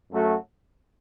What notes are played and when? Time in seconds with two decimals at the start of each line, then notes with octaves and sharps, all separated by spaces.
0.11 F#2 F#3 A3 F#4